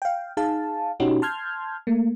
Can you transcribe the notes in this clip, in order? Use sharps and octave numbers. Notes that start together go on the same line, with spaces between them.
F5 G5
D#4 G#4 F5 A5
B2 C#4 D#4 F#4 G4
A5 C6 F6 G6 G#6
A3 A#3